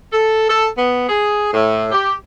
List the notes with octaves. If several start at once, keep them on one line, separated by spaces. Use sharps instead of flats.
A4
A4
B3
G#4
A2
G4